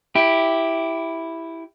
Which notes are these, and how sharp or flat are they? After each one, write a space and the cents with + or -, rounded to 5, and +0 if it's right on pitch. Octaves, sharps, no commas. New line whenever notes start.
E4 +0 G4 +0